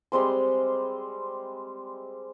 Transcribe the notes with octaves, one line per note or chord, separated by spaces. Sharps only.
G3 G#3 C4 C6